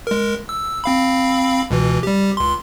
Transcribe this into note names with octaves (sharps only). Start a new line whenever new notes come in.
G#3 A#4
E6
C4 F5 B5
C#2 B2 E3
G3 G4
C#2 C6